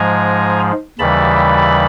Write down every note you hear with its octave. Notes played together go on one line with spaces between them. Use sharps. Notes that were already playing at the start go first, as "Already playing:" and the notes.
Already playing: G#2 F3 G#3 G#5 A#5
D#2 C#3 E3 G3 A5 B5